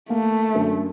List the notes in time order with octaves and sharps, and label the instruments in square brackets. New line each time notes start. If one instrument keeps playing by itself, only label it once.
[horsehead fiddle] A3 [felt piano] A#3
[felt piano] F#2 D3